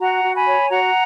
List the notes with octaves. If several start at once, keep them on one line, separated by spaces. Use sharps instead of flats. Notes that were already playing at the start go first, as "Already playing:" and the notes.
F#4 F#5 A#5
F#4
G#5 B5
C#5
F#4 F#5 A#5